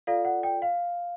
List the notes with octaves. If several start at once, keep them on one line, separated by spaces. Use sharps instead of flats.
F4 A4 D5 F5
F#5
G5
F5